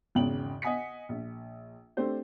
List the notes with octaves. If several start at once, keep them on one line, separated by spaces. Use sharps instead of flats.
G#1 E2 C#3 G5 F#7
D#5 F#5 G#5 D#6 B6 C#7
A#1
A3 C4 D4 G4 C5